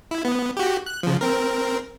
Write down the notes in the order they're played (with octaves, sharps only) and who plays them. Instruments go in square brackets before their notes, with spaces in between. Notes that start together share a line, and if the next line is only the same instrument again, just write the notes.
[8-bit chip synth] E4
B3
F#4 G4
F#6
C#3 F3
C4 A#4